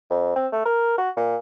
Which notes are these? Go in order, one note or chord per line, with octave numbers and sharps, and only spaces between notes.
F2
C4
A3
A#4
F#4
A#2